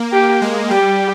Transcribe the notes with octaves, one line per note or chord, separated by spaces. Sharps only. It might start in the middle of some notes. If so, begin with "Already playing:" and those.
Already playing: A#3
G4
G#3
G3 G4